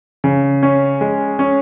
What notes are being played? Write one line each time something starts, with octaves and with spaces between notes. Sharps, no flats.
C#3
C#4
G#3
C#4